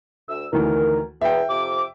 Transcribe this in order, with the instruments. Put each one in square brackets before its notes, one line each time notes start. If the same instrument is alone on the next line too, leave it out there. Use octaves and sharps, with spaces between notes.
[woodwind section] D2 E6
[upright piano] D2 D#3 E3 [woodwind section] A#4
[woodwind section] E2 [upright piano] E5 G5
[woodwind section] F2 C3 D6